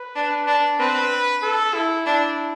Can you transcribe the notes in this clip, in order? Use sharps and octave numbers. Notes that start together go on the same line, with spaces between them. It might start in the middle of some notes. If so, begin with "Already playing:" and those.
Already playing: B4
D4
D4
C4 B4
A4
E4
D4 E4